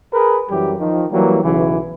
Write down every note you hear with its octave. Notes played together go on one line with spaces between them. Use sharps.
G#4 A#4 B4
F#2 E3 G3 G4
D#3 F3
E3 F#3 G3 A#3
B1 C#3 E3